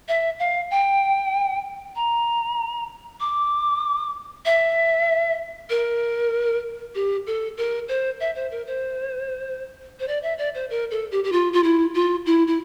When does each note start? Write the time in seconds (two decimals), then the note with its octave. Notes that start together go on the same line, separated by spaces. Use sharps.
0.08 E5
0.39 F5
0.71 G5
1.96 A#5
3.20 D6
4.45 E5
5.70 A#4
6.95 G4
7.27 A4
7.57 A#4
7.88 C5
8.20 E5
8.35 C5
8.51 A#4
8.67 C5
10.00 C5
10.08 D5
10.23 E5
10.38 D5
10.54 C5
10.70 A#4
10.91 A4
11.12 G4
11.24 G4
11.32 F4
11.53 F4
11.63 E4
11.94 F4
12.26 E4
12.47 E4